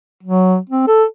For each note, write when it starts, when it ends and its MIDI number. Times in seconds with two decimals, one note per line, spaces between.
0.23 0.57 54
0.70 0.88 60
0.88 1.04 69